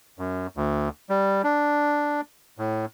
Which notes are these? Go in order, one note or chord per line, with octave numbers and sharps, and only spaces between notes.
F#2
D2
G3
D4
A2